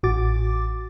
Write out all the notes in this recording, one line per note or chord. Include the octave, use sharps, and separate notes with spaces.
A1 F#4 D6 A6